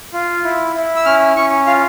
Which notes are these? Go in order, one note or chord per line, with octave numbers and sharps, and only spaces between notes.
F4
E4
E4
E6
C#4 F6
C#4 C#6
F4 F5